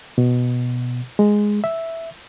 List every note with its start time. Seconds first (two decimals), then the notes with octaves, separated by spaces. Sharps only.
0.18 B2
1.19 G#3
1.64 E5